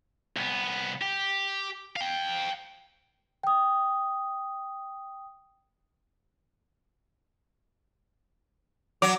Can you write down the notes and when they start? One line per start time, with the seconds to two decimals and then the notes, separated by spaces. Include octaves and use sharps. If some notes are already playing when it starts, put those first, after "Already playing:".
0.36 C2 B3
1.01 G4
1.96 F5 G5
3.43 G5 D#6
9.02 F#3 D6